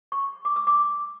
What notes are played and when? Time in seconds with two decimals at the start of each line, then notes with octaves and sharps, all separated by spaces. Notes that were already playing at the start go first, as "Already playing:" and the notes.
0.12 C#6
0.45 D6
0.56 E6
0.67 D6